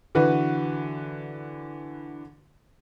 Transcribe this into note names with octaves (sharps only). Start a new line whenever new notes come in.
D3 E3 F#4 B4